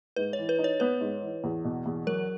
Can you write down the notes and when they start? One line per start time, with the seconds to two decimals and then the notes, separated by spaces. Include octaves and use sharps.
0.16 G#2 B4
0.33 C#5
0.39 E3
0.49 B4
0.59 D#4
0.64 C#5
0.80 B3 B4
1.01 G#2
1.22 E3
1.44 E2
1.64 B2
1.86 E2
2.07 F#3 A#4